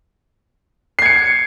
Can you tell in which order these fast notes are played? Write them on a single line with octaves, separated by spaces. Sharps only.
C7 G#6 C#7